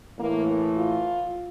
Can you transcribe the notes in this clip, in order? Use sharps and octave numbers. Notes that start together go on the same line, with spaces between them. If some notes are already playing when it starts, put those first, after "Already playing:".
A2 E3 A#3
F4